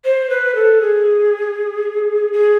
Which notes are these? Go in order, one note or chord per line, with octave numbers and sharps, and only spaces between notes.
C5
B4
A4
G#4
G#4